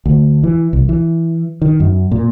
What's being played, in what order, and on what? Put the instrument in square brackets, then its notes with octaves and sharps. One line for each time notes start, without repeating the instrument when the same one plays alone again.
[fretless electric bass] D2
E3
C2
E3
D#3
F#2
A#2